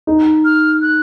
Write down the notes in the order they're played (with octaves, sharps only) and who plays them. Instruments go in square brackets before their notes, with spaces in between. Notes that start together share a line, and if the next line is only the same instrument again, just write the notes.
[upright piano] D#4
[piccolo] F6
F#6